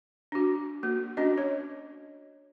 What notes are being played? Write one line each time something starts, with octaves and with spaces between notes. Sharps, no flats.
D4 F#4
A#3 F#4
C#4 D4 F#4 D#5
C#5